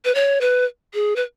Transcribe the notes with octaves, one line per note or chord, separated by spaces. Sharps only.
B4
C#5
B4
G#4
B4